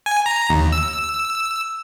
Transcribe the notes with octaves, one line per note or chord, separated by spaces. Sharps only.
G#5
A#5
D#2
E6